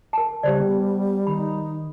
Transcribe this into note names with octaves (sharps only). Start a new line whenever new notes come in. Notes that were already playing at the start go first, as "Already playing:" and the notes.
A#4 A5
C#3 G3 G4 C5 D5
B3 D5
D#3 D#4 B5